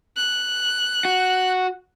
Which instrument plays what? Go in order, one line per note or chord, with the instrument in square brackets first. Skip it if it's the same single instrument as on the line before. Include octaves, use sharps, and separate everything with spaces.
[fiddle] F#6
[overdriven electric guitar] F#4